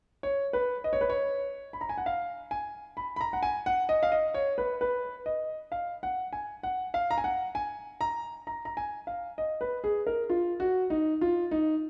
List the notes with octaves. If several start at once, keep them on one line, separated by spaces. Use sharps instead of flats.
C#5
B4
D#5
C#5
B4
C#5
B5
A#5
G#5
F#5
F5
G#5
B5
B5
A#5
F#5
G#5
F#5
D#5
F5
D#5
C#5
B4
B4
D#5
F5
F#5
G#5
F#5
F5
A#5
G#5
F#5
G#5
A#5
A#5
A#5
G#5
F5
D#5
B4
G#4
A#4
F4
F#4
D#4
F4
D#4